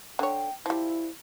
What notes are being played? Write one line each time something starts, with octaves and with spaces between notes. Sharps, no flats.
D3 C#5 G5
F3 G3 E4